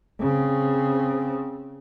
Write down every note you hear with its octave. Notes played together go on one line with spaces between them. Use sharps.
C#3 C4